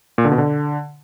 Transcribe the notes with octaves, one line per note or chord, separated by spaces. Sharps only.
A#2
D3
B2
D3